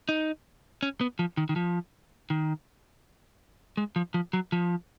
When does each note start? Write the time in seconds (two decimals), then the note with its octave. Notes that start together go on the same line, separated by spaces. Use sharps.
0.09 D#4
0.83 C#4
1.01 B3
1.19 F3
1.37 D#3
1.49 D#3
1.56 F3
2.30 D#3
3.77 G#3
3.96 F3
4.14 F3
4.33 F#3
4.52 F3